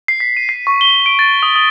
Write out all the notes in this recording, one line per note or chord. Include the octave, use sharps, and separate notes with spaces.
C7
B6
D#7
C7
C#6
G7
D7
A6
D#6
D#6